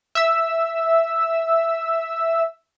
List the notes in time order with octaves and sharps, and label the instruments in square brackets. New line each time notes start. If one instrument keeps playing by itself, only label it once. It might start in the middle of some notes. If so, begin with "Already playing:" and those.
[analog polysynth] E5 E6